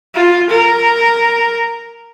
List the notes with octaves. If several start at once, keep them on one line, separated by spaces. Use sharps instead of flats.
F4
A#4